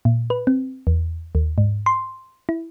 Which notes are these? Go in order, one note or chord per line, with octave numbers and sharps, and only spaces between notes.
A#2
B4
C4
E2
D#2
G#2
C6
E4